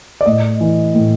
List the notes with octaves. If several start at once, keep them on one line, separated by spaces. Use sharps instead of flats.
D5
A2 D#5
E3
A2